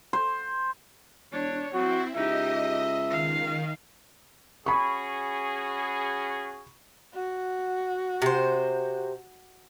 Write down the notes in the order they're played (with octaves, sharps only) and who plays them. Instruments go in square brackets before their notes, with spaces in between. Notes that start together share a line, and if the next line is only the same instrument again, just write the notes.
[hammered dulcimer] C5
[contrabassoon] E1 [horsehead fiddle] D4 C#5
[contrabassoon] F#3 [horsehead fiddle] C4 [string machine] E4 [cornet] F#4
[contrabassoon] C#2 [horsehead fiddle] D#4 G4 [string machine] D#5 [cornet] E5
[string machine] D#3 [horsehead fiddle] F5
[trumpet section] C#4 F#4 G#4 [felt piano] B5 C#6
[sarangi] F#4
[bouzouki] C3 C5